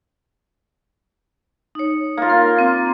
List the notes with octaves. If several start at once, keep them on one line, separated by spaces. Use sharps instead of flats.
D#4 C#5
A#3 F4
A#4
C4